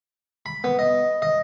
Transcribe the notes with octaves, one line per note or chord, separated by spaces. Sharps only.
B5
B3
D#5
D#5